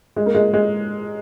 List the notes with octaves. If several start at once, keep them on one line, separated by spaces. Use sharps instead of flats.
G#3
A#3
G#3
G#3